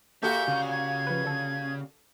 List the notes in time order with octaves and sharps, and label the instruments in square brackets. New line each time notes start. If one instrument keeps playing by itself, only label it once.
[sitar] A#2 F#4 G4 [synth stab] A#3 A4 [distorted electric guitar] E5 [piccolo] G6
[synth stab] D2 [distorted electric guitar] C#3
[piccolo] G#6
[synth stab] F3 B4
D3 A4